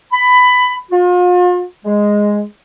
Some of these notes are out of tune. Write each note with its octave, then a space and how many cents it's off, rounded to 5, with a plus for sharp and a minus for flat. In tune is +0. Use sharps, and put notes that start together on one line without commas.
B5 +15
F4 +40
G#3 -5